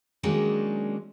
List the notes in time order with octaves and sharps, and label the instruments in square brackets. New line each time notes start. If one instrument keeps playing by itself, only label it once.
[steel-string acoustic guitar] D#3 F#3 G#3 A#3 C#4 D4